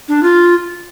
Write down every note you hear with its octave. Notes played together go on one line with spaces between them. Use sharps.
D4
F4